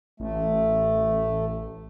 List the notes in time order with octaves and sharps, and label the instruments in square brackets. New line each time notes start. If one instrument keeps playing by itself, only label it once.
[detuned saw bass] A1 [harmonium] A3